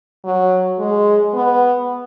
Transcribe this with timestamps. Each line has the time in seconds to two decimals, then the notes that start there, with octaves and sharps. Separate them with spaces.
0.25 F#3
0.79 G#3
1.35 B3